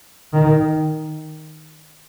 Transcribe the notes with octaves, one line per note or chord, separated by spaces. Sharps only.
D#3